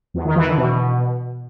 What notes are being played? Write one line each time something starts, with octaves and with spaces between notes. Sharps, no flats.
E2
D#3
E3
D3
B2